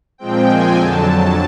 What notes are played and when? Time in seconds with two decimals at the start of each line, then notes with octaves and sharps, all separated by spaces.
0.18 A#2 F3 G#3 C4 G5
0.47 G#5
0.77 F2 D3 F#3 A5